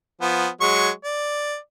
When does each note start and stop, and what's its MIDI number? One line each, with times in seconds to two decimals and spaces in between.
0.21 0.47 53
0.21 0.47 59
0.61 0.89 54
0.61 0.89 56
0.61 0.89 85
1.04 1.56 74